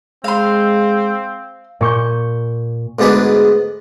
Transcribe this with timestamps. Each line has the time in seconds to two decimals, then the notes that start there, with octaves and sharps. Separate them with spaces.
0.24 G#3 C4 F5 C6
1.81 A#2 C#6 G6
2.99 D2 G#2 B3 D4 G#4 B4